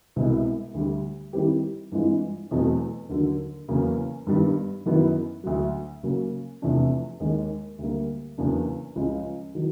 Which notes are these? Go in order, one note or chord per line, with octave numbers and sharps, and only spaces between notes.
C2 B2 G#3 C4 E4
D2 D3 G3
D#3 G3 C4 E4 G4
G2 E3 G#3 C4 F4
E2 B2 F#3 A3 C4
D#2 D3 F#3
E2 C#3 F#3 A#3
G2 D#3 G3 B3
F#2 D#3 F#3 B3 E4
D2 D3 F#3
C#3 F#3 A#3
E2 C3 F3 A3 D4
D#2 D#3 G#3
D2 D3 G3 A#3
E2 C#3 F#3 A#3 D4
C#2 C#3 F3 G#3
D#3 F#3